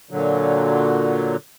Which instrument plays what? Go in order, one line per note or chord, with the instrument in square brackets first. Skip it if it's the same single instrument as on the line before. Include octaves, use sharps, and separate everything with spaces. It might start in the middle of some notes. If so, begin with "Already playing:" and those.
[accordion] A#2 D3 F#3